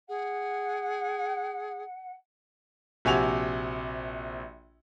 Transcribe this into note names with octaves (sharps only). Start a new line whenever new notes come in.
G#4 F#5
A#1 C3 F#4 G#5 G#6 F7